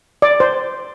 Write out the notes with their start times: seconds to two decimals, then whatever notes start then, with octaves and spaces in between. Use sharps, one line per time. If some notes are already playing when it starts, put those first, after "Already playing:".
0.22 D5
0.40 C5